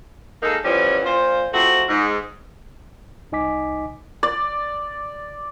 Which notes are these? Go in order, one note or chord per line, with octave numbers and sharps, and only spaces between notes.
G#3 A#3 D#4 A4 A#4
E3 F3 G3 B3 C#4
A#2 F3 F4 C5
C3 F3 A3 C4 F#4
G#2
C2 D#4 D#5 G#5 D6 B6
D5